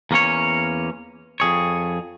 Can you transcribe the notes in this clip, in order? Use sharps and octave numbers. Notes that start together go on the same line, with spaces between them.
E2 A#3 C#4 C#5
F2 G#4 C#5